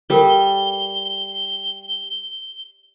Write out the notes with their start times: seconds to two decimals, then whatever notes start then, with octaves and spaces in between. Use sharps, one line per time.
0.10 G3 A4 A#4 G7